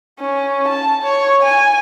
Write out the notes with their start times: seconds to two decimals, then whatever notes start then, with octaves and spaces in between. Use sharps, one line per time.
0.19 C#4
0.68 A5
1.03 C#5
1.43 G#5